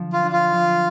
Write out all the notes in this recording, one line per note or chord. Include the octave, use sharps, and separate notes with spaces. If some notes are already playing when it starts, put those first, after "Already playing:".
Already playing: D3 F3
F4
D4
F4
F3